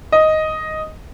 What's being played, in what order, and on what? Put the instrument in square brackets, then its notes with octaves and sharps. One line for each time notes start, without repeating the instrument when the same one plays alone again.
[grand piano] D#5